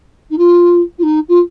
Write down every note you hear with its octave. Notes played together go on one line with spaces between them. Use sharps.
D#4
F4
F4
D#4
F4